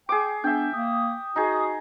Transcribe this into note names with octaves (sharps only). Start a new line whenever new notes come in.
G#4 G5 D6
B3 D4 E5 G5
A#3 D#6
D#4 F#4 G#4